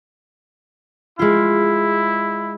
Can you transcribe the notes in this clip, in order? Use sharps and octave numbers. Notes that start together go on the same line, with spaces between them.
G#3 E4 F4